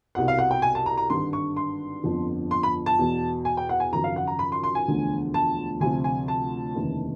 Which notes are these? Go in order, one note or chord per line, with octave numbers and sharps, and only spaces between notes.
C2 B2 F#5
F5
F#5
G5
G#5
A5
A#5
A#5
G#1 G2 D3 C6
C#6
C6
G1 F2 D3 F3
C6
B5
A5
E2 B2
G#5
G5
F#5
G#5
G#1 F#2 C#3 F3 A#5
F5
F#5
A#5
B5
C6
C6
G#5
E1 D2 D3 F3
A5
D2 C3 F3 G#5
G#5
A5
F1 D#2 C#3 E3